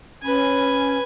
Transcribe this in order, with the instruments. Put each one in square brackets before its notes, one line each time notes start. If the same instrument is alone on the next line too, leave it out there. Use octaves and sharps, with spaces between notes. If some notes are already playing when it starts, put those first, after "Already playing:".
[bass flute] C#4 [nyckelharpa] B4 G#5